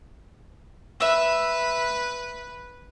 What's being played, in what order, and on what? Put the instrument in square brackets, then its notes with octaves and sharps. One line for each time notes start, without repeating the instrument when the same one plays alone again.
[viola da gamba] B4 [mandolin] E5 E6